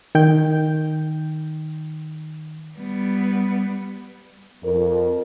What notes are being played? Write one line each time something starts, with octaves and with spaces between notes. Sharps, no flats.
D#3 G5 G6
G3 B3
F2 A#4